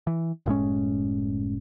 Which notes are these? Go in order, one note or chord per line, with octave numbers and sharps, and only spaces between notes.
E3
F#1 A2 G#3 C#4